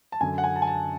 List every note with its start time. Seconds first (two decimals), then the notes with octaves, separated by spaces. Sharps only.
0.12 A5
0.20 F#2 D3 G#5
0.38 F#5
0.44 G#5
0.56 A5
0.62 G#5
0.67 A5